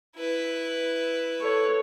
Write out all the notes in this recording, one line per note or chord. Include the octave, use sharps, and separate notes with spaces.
E4 B4
A4 C#5